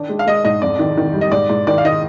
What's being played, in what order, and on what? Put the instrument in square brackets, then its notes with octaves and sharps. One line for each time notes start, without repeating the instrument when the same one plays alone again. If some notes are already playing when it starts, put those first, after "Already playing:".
Already playing: [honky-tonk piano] D#3 D4
G#3
[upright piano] F5
[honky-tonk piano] G#3 [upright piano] D#5
[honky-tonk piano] G#2 [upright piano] D#5
[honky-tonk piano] F2 [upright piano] D5
[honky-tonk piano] D#3
D#3
G3
[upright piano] D#5
[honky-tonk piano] G#2 [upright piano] D5
[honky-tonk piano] G#2
[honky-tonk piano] D#3 [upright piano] D5
[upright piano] F5
[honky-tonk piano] D#3 [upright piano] D#5